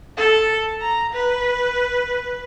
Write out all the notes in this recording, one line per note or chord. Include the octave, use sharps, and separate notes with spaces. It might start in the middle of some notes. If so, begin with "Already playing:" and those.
A4
A#5
B4